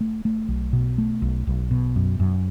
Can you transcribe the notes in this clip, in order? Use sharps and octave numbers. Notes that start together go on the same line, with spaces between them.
A3
A3
B1
B2
A3
B1
B1
B2
F#2
F#2